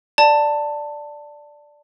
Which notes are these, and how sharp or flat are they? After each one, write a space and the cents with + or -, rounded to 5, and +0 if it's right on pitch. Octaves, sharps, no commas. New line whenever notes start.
D5 +0 A5 +15